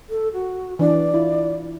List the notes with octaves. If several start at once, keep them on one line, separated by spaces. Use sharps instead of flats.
A4
F#4
E3 D4 D5
E4 F4